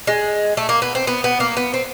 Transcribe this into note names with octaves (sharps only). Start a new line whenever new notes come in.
G#3
A3
A#3
B3
C4
B3
B3
A#3
B3
C4